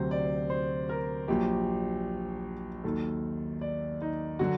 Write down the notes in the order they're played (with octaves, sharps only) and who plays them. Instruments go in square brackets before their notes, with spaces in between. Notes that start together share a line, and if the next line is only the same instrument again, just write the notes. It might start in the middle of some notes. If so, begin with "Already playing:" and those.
Already playing: [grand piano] D2 C3 F#3 C5
D5
C5
A#4
A#1 A#2 F#3 G4
D#2 D#3 F#3 A4
D5
D#4
D3 F#3 F#4